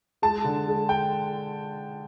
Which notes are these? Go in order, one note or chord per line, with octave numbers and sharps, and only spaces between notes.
G#3 A5
D3
G#3
G5